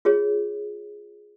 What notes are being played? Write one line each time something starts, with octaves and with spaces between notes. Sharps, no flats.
F4 G#4 C#5